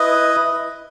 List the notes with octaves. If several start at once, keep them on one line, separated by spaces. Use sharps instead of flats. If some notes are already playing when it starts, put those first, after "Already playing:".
Already playing: E4 B4 D#5